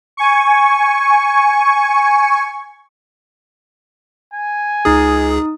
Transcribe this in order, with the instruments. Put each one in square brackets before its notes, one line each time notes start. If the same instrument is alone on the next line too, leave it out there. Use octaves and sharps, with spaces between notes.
[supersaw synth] G#5 C#6
[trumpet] G#5
[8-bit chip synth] C#2 G#4 [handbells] D#4 D#6